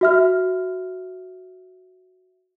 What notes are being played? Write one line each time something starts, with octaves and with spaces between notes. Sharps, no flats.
F#4 E5 F6